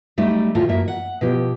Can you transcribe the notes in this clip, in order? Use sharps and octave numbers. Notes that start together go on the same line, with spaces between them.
F#3 G3 A3 D#4
D2 A2 F4 A4
F#2 A#3 E5
F#5
B2 F3 G4